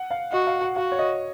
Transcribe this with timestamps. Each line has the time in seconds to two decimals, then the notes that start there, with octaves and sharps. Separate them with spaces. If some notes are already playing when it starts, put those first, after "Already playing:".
Already playing: F#5
0.11 F5
0.32 F#4 D#5
0.47 F5
0.62 F#5
0.76 F#4 F5
0.92 C#5
0.99 D#5